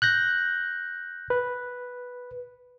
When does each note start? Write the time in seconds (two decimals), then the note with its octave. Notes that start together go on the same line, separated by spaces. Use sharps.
0.02 F#6 G6 A#6
1.30 B4